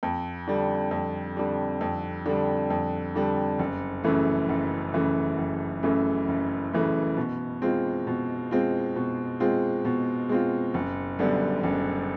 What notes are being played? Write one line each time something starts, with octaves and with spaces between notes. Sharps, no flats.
F2
D3 G3
F2
D3 G3
F2
D3 G3
F2
D3 G3
F#1
F#2 C#3 E3 A3
F#1
F#2 C#3 E3 A3
F#1
F#2 C#3 E3 A3
F#1
F#2 C#3 E3 A3
B2
G#3 C4 F4
B2
G#3 C4 F4
B2
G#3 C4 F4
B2
G#3 C4 F4
F#1
F#2 D3 G3 B3
F#1